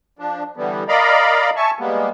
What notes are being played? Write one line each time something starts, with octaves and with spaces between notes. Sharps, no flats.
F3 D4
D3 E3 G3 B3
A#4 D5 D#5 F5 A#5 B5
E5 G#5 A5 C#6
G3 G#3 A#3 B3